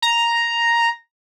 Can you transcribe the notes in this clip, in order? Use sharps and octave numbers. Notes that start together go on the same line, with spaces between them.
A#5